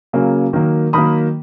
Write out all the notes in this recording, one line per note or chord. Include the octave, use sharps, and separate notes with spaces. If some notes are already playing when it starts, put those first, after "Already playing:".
C#3 F#3 A#3 C#4
D#3 F#3 A#3
D#3 F#3 A#3 B5 D#6